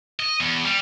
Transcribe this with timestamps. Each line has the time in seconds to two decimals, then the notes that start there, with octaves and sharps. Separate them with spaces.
0.20 D#5
0.40 E2
0.65 G3